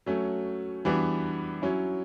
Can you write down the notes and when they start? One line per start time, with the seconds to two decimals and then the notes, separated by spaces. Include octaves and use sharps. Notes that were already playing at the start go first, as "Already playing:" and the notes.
0.06 F#3 A3 C#4
0.85 E3 G3 B3 D4 F#4
1.62 F#3 C#4 E4